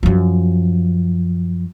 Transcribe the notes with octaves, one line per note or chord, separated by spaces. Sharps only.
F#2 F3